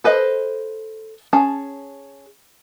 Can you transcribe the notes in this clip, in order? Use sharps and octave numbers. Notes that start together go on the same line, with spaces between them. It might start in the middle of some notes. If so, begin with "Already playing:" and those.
A4 B4 C5 D#5
C#4 G#4 A5